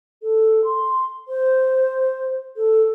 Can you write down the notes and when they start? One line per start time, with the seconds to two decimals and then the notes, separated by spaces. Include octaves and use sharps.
0.23 A4
0.65 C6
1.28 C5
2.57 A4